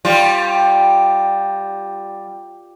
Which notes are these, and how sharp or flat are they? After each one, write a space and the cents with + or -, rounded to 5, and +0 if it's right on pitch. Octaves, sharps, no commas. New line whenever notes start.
G3 +0 C#4 -45 F4 +0